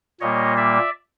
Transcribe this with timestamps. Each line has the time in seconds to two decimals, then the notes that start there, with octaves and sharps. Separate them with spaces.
0.21 A#2 G3 A#3 C#5 D#5
0.57 D5 E5